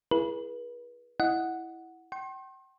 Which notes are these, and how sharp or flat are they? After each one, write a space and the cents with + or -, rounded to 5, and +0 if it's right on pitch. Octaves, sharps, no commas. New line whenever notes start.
E4 +20 G#4 +10 B4 -35
E4 +0 D#5 +0 F#5 +0
G5 -40 C6 +40